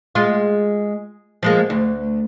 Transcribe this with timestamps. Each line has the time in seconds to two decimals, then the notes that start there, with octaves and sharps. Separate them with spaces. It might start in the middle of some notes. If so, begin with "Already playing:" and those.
0.15 G#3 F4
1.43 F3 G#3 A#3
1.70 D2